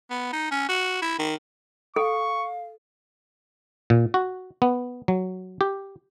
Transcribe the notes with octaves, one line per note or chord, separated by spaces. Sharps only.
B3
D#4
C#4
F#4
E4
D#3
A4 F5 C#6
A#2
F#4
B3
F#3
G4